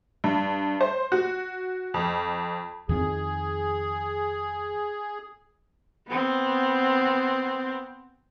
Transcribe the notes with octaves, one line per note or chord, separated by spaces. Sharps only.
G2
C5
F#4
F2
F2 D#3 C4 G#4
B3 C4